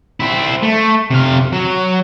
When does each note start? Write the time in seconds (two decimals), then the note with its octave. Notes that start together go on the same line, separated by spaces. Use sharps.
0.20 C4 E4
0.63 A3
1.11 C3 F5
1.53 F#3